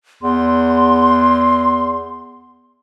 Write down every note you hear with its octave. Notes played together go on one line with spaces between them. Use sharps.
E2 C6